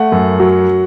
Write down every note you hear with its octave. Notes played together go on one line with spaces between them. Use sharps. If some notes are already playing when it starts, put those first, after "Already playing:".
Already playing: A3 F#5
F#2
F#3